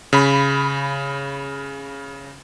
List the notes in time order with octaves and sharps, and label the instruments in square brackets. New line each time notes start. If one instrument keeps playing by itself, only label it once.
[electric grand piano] C#3 B5